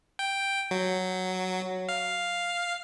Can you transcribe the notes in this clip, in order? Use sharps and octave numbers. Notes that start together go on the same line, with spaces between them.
G5
F#3
F5